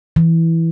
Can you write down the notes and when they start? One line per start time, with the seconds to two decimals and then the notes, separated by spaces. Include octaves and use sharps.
0.16 E3